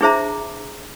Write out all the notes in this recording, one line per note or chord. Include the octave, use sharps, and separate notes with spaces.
D4 E4 G#4 C5 E5 A#5